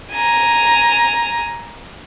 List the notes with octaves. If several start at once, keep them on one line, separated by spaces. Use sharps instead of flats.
G#5 A#5